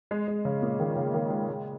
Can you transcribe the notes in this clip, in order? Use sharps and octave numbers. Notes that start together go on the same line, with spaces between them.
G#3
G#3
C#3
A#2
D#3
C#3
D#3
G#3
G#3